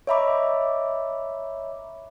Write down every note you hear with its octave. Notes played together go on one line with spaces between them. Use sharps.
C#5 D#5 E5 A#5 B5 D6